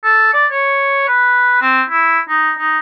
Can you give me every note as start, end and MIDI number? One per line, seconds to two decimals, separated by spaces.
0.04 0.30 69
0.34 0.46 74
0.51 1.07 73
1.08 1.58 71
1.62 1.82 60
1.89 2.20 64
2.29 2.52 63
2.59 2.79 63